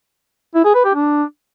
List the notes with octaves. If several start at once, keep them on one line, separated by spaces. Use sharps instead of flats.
E4
G#4
B4
G4
D4